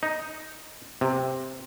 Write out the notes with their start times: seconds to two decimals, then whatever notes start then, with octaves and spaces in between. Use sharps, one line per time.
0.03 D#4
1.01 C3